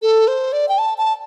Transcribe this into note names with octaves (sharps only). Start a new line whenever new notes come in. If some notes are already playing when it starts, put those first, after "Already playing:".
A4
C5
D5
G5
A5
A5